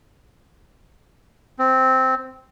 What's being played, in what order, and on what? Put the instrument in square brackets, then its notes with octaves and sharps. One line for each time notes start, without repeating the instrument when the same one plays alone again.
[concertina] C4